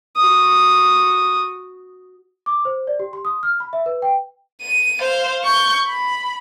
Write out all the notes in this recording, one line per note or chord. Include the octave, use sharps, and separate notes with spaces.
F#4 D#6
D6
C5
D5
G4
C6
D#6
F6
B5
E5
B4
G5
D#7
C5 F5
C#6 G6
B5